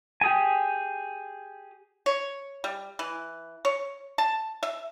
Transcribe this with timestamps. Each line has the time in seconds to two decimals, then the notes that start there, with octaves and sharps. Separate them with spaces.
0.21 G4 G#4 G#5
2.06 C#5
2.64 G3
2.99 E3
3.65 C#5
4.18 A5
4.63 E5